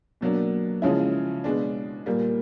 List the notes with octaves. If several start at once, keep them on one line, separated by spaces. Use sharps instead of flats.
B2 F#3 A#3 D4
C#3 F3 G#3 C#4 E4
B2 G#3 B3 D4
A#2 G3 A#3